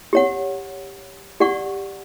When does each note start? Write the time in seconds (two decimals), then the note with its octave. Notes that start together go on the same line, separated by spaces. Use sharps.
0.13 G4 C#5 F#5
1.40 G4 D5 F#5 C#6